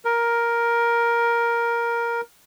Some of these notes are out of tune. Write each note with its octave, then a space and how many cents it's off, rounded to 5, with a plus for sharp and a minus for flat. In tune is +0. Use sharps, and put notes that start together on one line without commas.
A#4 +10